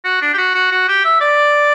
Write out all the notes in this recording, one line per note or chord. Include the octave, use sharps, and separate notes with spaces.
F#4
D4
G4
F#4
F#4
F#4
G4
E5
D5